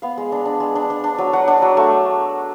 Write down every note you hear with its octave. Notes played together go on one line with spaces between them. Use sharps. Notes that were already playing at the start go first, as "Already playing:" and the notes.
B3 F5
G#3
D4
D4
G#3
D4
D4
D4
F#3
F#3 F#5
D4
F#3
A3